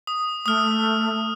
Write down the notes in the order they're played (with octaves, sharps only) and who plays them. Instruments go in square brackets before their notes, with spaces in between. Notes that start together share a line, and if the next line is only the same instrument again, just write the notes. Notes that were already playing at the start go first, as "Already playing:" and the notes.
[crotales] D#6
[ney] A3 [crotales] D#6 F6